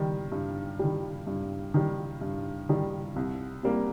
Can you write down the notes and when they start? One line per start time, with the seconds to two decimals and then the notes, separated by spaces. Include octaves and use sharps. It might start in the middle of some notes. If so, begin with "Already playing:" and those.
Already playing: D#3 G3
0.32 G2
0.79 D#3 G3
1.27 G2
1.74 D#3 G3
2.21 G2
2.69 D#3 G3
3.16 C2
3.63 C3 G3 A#3